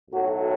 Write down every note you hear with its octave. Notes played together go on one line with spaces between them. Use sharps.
B1 A2 F#3 F#4